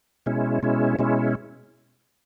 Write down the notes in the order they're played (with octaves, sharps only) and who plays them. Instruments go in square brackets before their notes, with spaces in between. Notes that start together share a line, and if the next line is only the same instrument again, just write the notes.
[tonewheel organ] B2 G#3 C#4 E4
B2 G#3 C#4 E4
B2 G#3 C#4 E4